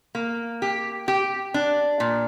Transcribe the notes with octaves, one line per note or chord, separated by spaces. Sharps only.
A#3
G4
G4
D4
A#2